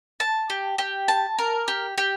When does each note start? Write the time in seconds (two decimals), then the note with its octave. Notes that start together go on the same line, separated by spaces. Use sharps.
0.20 A5
0.50 G4
0.78 G4
1.08 A5
1.39 A#4
1.68 G4
1.98 G4